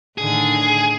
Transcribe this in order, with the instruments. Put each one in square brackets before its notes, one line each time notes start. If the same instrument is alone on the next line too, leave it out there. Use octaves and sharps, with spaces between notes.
[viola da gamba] A2 D3 D#3 [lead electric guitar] G#4